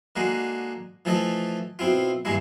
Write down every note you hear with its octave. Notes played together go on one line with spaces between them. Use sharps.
D3 G#3 A#3 D#4 F#4
E3 F3 A3 A4 D#5
B2 C4 E4 F4
G2 D#3 G#3 A#3 E4